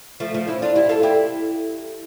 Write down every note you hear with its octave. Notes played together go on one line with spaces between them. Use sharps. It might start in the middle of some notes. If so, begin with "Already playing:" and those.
F3 A3
F3 A3
C#4 E4
D4 F4
E4 G4
F4 A4
E4 G4